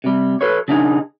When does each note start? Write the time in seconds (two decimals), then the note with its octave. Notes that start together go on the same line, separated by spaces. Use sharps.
0.04 C3 G3
0.41 A4 B4 C#5
0.68 C#3 D4 D#4 G#4